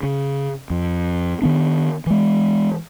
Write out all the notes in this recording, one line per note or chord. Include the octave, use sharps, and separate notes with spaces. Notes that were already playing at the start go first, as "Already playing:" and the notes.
C#3
F2
D#3 B3 D4
E3 G#3